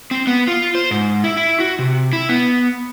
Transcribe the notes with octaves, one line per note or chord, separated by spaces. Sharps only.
C4
B3
F4
C5
G#2
E4
E4
F#4
C3
E4
B3